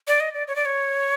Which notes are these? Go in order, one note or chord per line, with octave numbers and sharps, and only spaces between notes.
D5
D#5
D5
C#5
D5
C#5